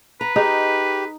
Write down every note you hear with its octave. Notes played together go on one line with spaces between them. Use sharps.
B4 A#5
D#4 G4 G#4